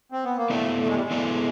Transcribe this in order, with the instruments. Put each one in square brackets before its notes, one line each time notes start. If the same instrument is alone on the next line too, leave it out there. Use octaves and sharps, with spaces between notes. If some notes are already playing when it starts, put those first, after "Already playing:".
[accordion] C4
B3
A#3
[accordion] A3 [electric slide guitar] B3 E4 A4 D5
[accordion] A3
G#3
G3
G#3
[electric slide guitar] B3 E4 A4 D5